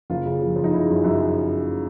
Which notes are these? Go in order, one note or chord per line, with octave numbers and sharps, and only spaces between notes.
F#1 F4
C#3
F3
F3
D#4
C#3 E4
F#2
F#2